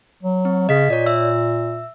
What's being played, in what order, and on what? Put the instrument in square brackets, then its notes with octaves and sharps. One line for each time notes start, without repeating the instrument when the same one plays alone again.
[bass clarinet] F#3
[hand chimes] C4
[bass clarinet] C#3 [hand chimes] D#5 B6
[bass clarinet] A#2 [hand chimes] C#5 D5
[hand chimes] E5 E6